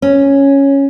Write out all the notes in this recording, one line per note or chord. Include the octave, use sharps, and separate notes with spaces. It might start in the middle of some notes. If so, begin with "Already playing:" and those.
C#4